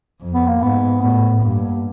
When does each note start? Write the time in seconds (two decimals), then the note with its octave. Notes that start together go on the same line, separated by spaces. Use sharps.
0.20 F2
0.34 B3
0.48 A#3
0.60 G#2 B3
1.01 A2 B3
1.42 G2 A#3